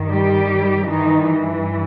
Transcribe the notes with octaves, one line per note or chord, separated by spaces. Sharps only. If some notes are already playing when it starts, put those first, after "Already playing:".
Already playing: G2 D#3
G3 G4
G2 D#3 E3 D#4